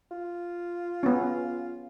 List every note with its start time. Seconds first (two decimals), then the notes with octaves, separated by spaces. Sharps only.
0.11 F4
1.03 B3 C#4